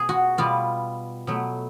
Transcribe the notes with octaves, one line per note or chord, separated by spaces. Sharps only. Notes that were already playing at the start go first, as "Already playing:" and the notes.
Already playing: B2 B3 G#4
F#4
B2 G3 B3 F4
B2 F#3 A3